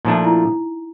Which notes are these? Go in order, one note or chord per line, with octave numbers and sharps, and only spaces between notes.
A#2 F3 A3 D4 D#4
E4